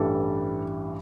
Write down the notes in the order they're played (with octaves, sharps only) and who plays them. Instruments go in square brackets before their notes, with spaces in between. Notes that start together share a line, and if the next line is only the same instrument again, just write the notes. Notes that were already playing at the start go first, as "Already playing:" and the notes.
Already playing: [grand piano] A1 G2 E3 G3 A4